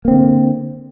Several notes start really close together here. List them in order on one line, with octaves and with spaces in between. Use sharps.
A#3 C4 D3